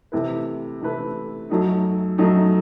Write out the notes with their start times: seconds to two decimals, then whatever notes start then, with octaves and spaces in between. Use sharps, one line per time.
0.12 C3 E3 A3 E4 B4
0.81 C3 E3 A3 E4 B4
1.50 F#2 F#3 A3 D#4
2.18 F#2 F#3 A3 D#4